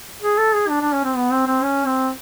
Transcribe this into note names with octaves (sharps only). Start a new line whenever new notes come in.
G#4
A4
G#4
D4
D4
C#4
C4
B3
C4
C4
C#4
C4